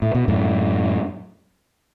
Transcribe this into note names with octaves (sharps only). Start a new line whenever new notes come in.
A2
B2
F#2 A2